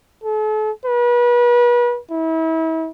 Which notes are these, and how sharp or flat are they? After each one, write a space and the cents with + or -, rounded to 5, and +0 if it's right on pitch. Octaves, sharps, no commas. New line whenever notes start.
A4 -40
B4 -35
E4 -35